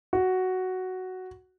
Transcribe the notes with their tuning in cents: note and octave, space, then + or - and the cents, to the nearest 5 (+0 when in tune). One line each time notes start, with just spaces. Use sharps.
F#4 +5